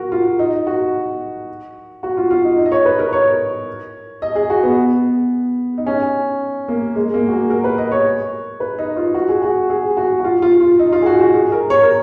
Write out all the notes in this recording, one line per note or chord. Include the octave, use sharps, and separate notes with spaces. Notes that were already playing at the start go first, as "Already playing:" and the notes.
Already playing: F#4 A#4
F4
D#4
F#4
F#4
F4
F4
D#4
D#4
D#5
C#5
B4
A#4
C#5
D#5
G#4
F#4
B3
D#4
C#4
A#3
G#3
A#3
F#4
G#4
A#4
B4
D#5
C#5
B4
D#4
F4
F#4
G#4
F#4
G#4
F#4
F#4
F4
F4
F4
D#4
F4
G#4
F#4
F#4
G#4
A#4
C#5
A#4